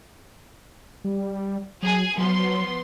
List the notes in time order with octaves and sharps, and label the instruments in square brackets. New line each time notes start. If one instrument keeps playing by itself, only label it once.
[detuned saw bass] G3
[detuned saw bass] F#3 [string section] G#4 G#5
[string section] F3 B3 C6 [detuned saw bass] F#3